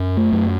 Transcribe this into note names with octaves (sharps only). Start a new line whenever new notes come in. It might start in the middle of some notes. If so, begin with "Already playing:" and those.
Already playing: F#2
A3
F#2